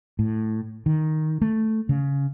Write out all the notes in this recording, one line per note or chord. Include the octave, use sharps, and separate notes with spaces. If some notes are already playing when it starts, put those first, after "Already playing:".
A2
D#3
A3
C#3